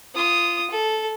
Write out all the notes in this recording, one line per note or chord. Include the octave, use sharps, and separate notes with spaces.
F4 D#6
A4